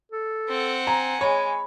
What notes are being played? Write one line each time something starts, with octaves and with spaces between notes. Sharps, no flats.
A4
C4 F#5
G#5 A#5
G#3 C#5 B5